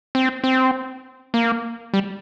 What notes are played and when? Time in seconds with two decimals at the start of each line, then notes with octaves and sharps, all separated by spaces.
0.15 C4
0.44 C4
1.34 A#3
1.94 G3